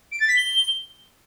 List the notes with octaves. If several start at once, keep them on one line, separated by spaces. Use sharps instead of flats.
D7
A6
B6
G7